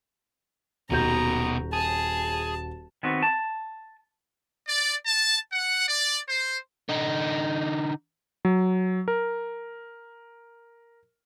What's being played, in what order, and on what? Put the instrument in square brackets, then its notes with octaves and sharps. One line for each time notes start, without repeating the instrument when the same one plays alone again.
[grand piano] D#1 F#4 G6 [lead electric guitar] B2 D#3 [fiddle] A#5
[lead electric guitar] G#4 [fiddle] A5
[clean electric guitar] D#3 B3 C4 F#4
A5
[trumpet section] D5
A5
F#5
D5
C5
[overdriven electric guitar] D3 D#4
[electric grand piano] F#3
A#4